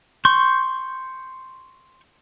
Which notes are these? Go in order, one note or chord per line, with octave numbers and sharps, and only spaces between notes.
C6 C#6 G6